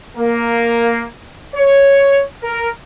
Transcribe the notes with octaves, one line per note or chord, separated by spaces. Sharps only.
A#3
C#5
A#4